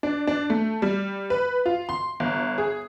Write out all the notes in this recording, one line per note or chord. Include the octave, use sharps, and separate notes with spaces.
D4
D4
A3
G3
B4
F4
C6
G1
G#4